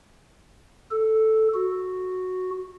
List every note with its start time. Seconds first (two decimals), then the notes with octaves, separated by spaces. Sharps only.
0.91 A4
1.54 F#4